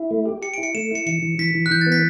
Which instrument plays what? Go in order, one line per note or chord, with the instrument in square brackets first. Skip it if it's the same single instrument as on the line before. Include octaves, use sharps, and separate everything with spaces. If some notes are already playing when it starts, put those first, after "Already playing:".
Already playing: [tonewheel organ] E4
A3
G4
[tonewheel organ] G4 [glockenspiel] C#7
[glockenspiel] D7
[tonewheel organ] E4
[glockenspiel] C#7
[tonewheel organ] A3 [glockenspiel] E7
[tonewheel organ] E4 [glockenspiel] C#7
[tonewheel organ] E3 [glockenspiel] C#7
[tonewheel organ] E3
[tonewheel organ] E3 [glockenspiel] B6
[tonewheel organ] E3
[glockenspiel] F#6
[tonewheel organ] E3 [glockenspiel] G6
[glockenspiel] A6
[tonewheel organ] B3
[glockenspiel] B6